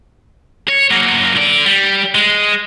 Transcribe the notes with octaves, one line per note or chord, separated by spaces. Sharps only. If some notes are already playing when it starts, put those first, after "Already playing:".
C#5
F#3 A#3
D3 D5
G3
G#3